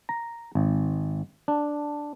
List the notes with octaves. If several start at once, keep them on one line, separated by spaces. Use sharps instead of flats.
A#5
G#1
D4